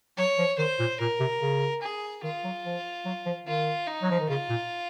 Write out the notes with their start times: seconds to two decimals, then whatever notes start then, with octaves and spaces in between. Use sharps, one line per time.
0.17 F#3 C#5
0.38 F3
0.58 D#3 C5
0.79 A#2
1.00 A#2 A#4
1.20 C3
1.41 C#3
1.82 G#4
2.23 D#3 F4
2.44 F#3
2.65 F3
3.05 F#3
3.26 F3
3.46 D#3 F4
3.87 D#4
4.02 F#3
4.11 F3
4.20 D#3
4.28 C#3 F4
4.49 A#2